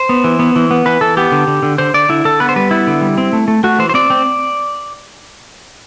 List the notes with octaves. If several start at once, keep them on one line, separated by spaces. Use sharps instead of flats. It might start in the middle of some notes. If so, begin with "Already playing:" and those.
Already playing: C5
B3
E3
B3
E3
B3
E3 B4
E3 A4
B3 G4
D3
D3
D3
D3 C5
D3 D5
D3 E4
D3 A4
B3 B4
C5
G3 B4
B3 E4
D3
G3
C4
A3
A3
A3 F#4
E3 C5
C5
C4 D5
C4